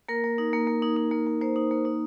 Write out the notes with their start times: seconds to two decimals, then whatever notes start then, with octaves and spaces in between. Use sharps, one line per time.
0.09 A#3 A#4
0.24 A#3
0.38 D#4
0.53 A#3
0.67 A#3
0.82 D#4
0.97 D#4
1.11 A#3
1.27 A#3
1.41 A#3 C5
1.56 D#4
1.71 A#3
1.85 D#4